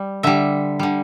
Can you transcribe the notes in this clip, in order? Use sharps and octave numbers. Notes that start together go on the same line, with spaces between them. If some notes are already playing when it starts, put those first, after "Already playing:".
Already playing: G3
D3 G3 E5
D3 G3